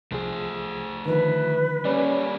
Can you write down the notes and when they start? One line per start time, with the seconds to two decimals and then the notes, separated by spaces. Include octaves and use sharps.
0.12 C2 F3 A3 G#4 C5
1.06 D3 D#3 F3 B4
1.85 G3 A#3 C#4 D5 B5